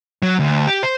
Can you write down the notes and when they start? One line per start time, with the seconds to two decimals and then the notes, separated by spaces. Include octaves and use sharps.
0.23 F#3
0.39 D2
0.67 G4
0.83 C5